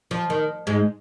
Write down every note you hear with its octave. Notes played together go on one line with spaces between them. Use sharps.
F3
D#3
G#2 G#3